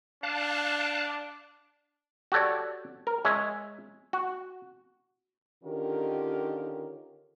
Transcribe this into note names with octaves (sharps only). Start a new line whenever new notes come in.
D4 F5 A5 F#6
F#4 G4 A4 C#5 D5
A#4
G#3 C#5 E5
F#4
D3 D#3 C#4 F4 G4 A#4